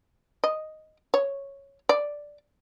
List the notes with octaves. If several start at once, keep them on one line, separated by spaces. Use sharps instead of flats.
D#5
C#5
D5